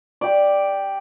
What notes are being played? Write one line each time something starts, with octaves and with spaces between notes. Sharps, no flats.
G4 D5